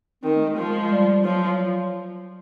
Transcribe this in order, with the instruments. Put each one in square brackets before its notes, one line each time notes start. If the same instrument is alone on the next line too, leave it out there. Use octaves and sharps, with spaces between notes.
[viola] D#3 [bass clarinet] C4
[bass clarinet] A3
G#3
[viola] F3
[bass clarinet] G3
[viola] F3 [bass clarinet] F#3